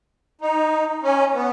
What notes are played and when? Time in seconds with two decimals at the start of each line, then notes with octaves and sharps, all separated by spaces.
0.41 D#4
1.03 C#4
1.34 B3